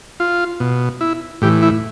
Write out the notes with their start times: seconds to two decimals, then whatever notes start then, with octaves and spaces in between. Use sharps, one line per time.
0.20 F4
0.60 B2
1.01 E4
1.42 A2 E3 G4
1.63 E4